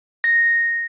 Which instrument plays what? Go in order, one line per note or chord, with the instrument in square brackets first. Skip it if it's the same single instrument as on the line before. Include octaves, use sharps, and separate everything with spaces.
[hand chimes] A#6